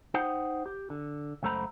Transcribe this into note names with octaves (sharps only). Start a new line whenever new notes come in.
D#4 C5 F#5 G5
G4
D3
C#2 F#2 A3 C5 A#5 B5